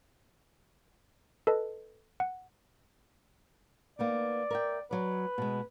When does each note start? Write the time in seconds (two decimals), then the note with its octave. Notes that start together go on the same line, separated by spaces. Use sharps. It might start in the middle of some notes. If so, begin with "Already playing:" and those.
1.47 A4 B4 D#5 A5
2.20 F#5
3.99 A#3 B3 D#4 D5
4.51 A#4 E5 G5
4.91 F#3 B4 D5
5.38 B2 G#3